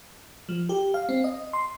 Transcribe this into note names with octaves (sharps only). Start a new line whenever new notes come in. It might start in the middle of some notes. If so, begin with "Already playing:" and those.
F3
G4
F5
C4
D#5
C6